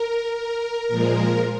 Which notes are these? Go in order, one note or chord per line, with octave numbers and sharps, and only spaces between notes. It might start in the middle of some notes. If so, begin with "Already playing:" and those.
Already playing: A#4
A#4
A#2 F3 G#3 A#4